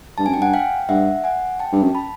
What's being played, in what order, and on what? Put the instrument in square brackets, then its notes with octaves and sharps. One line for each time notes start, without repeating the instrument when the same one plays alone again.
[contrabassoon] G2 [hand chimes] A5
[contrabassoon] F#2 [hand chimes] G#5
[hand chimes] G5
[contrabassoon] G2 [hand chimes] F#5 G#5
[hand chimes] F5 G5
[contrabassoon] G2 [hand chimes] E5 F#5
[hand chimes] F#5 G#5
G5 A5
[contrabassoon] G2
F#2
[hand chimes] A5 B5